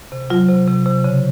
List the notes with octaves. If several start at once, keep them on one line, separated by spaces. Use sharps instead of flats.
C3
F#3 F4
C3
C3
C3
C#3